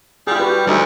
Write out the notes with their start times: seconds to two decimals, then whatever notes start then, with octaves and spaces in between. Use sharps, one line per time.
0.27 G3 F4 G#4
0.40 F#4 G4 B4
0.67 D2 G3 D#4 E5